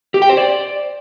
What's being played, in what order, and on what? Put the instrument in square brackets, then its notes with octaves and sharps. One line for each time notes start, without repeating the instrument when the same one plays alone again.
[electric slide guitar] G4
G5
C5
D5